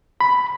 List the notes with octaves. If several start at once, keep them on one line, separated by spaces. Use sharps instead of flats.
B5